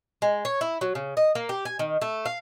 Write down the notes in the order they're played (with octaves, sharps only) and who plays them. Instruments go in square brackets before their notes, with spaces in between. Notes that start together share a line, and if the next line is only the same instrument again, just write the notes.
[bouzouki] G#3
C#5
E4
F#3
C#3
D#5
A#3
G4
G#5
D#3
A3
F5